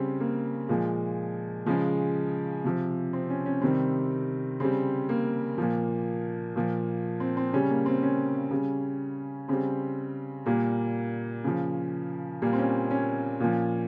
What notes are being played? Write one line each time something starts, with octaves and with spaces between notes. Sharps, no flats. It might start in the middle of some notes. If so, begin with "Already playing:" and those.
Already playing: C#3 G3 C4
A#3
A#2 F3 G#3
C#3 F3 G#3
C3 F3
C4
C#4
C#4
C3 D#3 G3 C4
C#3 G3 C4
A#3
A#2 F3
A#2 F3
C4
C4
C#3 G3 C#4
A#3
C4
C#4
C#3 G3
C#3 G3 C4
A#2 G3 A#3
C#3 F3
A#2 G3 A#3
C4
C#4
C#4
A#2 F3